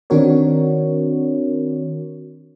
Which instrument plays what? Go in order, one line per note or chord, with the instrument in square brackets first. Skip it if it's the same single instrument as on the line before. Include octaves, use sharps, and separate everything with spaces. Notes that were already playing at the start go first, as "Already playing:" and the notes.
[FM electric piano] D#3 C4 D4 F#4 A#4 C#5